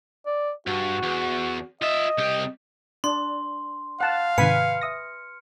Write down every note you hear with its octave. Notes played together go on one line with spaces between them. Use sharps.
D5
G2 F#4
E2
F4 D#5 E5
C2 G4
D4 C6
F5 F#5 A5
G#2 C3 D#3 B4 G#5 B5 F6 C#7
E5 D#6 A#6